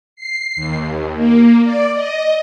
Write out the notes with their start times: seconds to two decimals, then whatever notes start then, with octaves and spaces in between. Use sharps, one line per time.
0.16 C7
0.56 D#2
1.15 A#3
1.64 D5
1.94 D#5